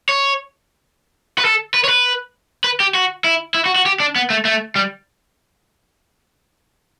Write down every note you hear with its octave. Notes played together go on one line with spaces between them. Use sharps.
C#5
B4
A4
B4
C#5
B4
B4
G4
F#4
E4
E4
F#4
F#4
G4
D4
B3
A3
A3
G3